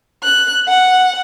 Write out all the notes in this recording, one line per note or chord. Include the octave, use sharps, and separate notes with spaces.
F#6
F#5